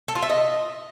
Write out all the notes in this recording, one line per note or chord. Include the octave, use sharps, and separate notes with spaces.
A4
F4
E5
D#5